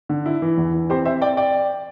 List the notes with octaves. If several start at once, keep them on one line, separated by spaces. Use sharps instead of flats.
D3
E4
E3
E2
E3
C4 G4 C5
C4 C5 E5
C4 D5 G5
D5 G5